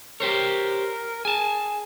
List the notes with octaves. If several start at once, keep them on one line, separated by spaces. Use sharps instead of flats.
G4 A#4 C5 C#5
G#4 G#5 A5